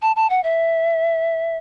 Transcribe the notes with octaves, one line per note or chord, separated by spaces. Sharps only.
A5
A5
F#5
E5